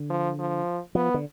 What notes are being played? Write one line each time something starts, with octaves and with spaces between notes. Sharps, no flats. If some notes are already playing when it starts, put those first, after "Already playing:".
Already playing: D3
F3
F3
F3 B3
D3